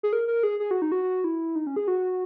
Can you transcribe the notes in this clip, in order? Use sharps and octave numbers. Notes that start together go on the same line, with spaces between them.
G#4
A#4
A#4
G#4
G#4
F#4
D#4
F#4
E4
D#4
C#4
G#4
F#4